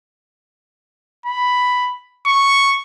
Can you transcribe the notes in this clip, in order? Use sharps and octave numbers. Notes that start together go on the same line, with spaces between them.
B5
C#6